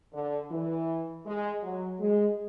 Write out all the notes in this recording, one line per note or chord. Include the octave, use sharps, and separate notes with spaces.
D3
E3
G#3
F#3
G#3